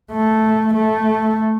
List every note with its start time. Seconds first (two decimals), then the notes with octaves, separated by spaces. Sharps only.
0.12 A3
0.74 A3